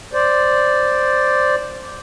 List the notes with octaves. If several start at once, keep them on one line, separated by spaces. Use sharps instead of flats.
C5 D5